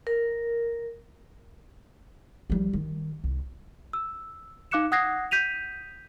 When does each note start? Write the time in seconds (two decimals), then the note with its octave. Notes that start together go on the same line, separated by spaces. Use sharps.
0.07 A#4
2.50 F3 G3
2.73 D#3
3.24 C2
3.93 E6
4.71 D#4 F5 D6 F#6 C#7 E7
4.92 F#5 D#6 F#6 G#6 A#6 C7
5.31 G6 B6 D#7 F7